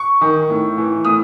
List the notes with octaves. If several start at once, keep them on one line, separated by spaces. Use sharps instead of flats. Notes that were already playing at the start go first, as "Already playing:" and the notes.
Already playing: C#6
D#3
A2
E3
A2 D#6